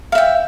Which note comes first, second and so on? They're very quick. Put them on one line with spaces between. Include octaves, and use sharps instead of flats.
F5 E5 G5